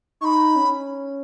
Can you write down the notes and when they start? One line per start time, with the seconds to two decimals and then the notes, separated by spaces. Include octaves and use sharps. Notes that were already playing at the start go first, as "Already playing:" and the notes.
0.21 D#4 C#6
0.25 B5
0.56 C#4